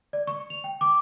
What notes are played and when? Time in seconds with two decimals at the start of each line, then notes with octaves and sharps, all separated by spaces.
0.13 D5
0.27 C#6
0.50 F7
0.64 G5
0.81 D6